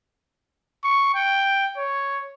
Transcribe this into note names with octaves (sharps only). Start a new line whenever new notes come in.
C#6
G5
C#5